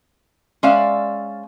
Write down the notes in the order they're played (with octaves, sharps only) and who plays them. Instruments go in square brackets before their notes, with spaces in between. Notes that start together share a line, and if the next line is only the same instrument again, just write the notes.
[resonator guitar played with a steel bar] G#3 C#4 D5 E5 F5